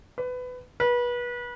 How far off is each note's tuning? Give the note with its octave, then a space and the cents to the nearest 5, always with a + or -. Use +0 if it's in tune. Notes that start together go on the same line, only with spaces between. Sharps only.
B4 +20
B4 -30